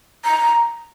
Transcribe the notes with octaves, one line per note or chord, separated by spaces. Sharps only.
A#5